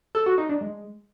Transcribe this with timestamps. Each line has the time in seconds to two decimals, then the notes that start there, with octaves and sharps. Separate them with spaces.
0.15 A4
0.26 F#4
0.38 D#4
0.49 D4
0.61 G#3